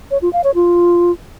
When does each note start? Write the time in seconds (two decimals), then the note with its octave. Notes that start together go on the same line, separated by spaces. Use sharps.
0.11 C#5
0.22 F4
0.33 F5
0.44 C#5
0.55 F4